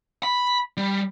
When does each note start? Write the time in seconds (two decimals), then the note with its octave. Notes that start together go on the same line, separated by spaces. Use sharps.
0.23 B5
0.77 G3